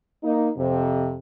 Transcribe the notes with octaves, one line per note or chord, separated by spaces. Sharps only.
A#3 D#4
F2 C3